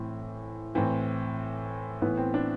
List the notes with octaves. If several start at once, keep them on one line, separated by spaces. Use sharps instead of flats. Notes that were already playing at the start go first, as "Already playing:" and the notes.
Already playing: A2 E3 C4
A2 E3 C4
A2 E3 B3
C4
D4